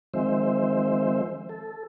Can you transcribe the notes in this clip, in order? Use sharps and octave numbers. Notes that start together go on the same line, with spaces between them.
D#3 F3 G#3 C4 C5 E5
A4